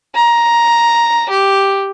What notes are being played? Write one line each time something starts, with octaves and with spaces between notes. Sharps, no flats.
A#5
G4